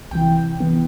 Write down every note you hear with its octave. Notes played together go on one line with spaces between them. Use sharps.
C2 C3 E3 G5
E3 B3